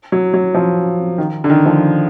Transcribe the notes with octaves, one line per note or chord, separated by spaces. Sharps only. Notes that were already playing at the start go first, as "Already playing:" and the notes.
F#3
F#3
F3
D#3
D3
D#3
F3